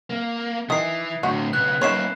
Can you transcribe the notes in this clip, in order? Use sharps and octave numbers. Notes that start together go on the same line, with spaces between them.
A#3
D#3 E3 D#6 C7
A2 D3 F#4
C#3 B3 F#6
D#3 A#3 C#4 B4 C#5 B5 C7 E7